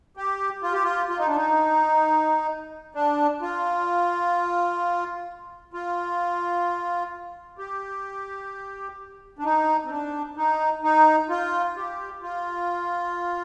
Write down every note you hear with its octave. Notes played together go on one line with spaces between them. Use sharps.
G4
F4
G4
F4
F4
D#4
D4
D#4
D4
F4
F4
G4
D4
D#4
C4
D4
D#4
D#4
F4
G4
F4